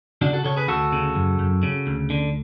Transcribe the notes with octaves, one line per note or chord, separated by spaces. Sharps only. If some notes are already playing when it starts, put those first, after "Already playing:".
C#3 D4 F#4
F#4 A4
C#3 A4 C#5
G#4 B4
D2 F#4 A4
C#3
F#2
F#2
C#3
D2
D3